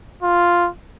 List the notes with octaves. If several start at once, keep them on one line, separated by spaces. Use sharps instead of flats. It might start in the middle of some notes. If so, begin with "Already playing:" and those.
F4